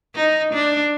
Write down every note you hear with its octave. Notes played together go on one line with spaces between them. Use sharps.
D#4
D4